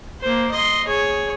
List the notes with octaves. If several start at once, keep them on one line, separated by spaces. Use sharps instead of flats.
A#3 C5
D#5 C6
G#4 C#5